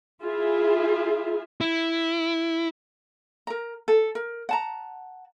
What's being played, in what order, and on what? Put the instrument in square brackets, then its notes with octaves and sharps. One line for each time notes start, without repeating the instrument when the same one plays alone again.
[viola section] E4 F4 G#4 E5
[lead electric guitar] E4
[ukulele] A#4 A#5
A4
A#4
F#5 A5 A#5